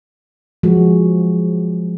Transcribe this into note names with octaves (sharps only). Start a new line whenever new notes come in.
F3 F#3 G#3 F#4